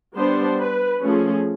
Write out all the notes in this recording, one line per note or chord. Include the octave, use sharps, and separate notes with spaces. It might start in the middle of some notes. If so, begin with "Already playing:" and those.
G3 B3 D4 C5
B4
F3 A3 C#4 G#4